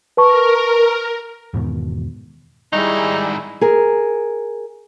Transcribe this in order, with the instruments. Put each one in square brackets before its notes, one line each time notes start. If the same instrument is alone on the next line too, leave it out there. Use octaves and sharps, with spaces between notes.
[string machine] A#4 [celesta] B4 A5 C#6
[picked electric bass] E2 G#2 B2 D#3
[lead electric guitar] G#2 D#3 [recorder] G3 [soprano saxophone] D#4 [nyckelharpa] E4 G#4
[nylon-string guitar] G#4 A#4